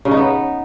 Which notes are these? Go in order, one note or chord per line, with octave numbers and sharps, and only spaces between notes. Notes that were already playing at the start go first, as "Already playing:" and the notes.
C#3
D#4
B3